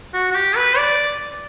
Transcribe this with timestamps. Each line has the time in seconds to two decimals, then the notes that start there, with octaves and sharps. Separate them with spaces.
0.14 F#4
0.31 F#4
0.35 G4
0.56 B4
0.78 D5